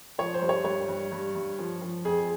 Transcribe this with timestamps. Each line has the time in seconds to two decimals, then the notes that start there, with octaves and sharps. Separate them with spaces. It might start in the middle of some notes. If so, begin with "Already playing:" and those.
0.18 F3 C#5
0.34 C5
0.42 G2
0.49 C#5
0.65 G2 C#5
0.88 G2
1.12 G2
1.35 G2
1.59 F3
1.81 F3
2.05 F2 G#4